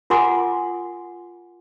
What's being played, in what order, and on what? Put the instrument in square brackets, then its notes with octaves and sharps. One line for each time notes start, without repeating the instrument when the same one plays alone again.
[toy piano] F4 A#4 F#5 G#5 C6 D6